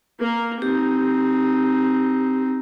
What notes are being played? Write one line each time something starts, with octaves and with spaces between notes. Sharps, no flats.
A#3 A#4
C4 D#4 G4